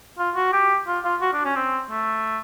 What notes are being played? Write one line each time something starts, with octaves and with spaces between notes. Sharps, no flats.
F4
F#4
G4
F4
F4
F#4
D4
C#4
C4
A3